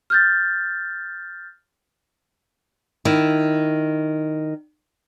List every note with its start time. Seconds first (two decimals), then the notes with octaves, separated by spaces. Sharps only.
0.10 F6 G6 A6
3.05 D#3 E4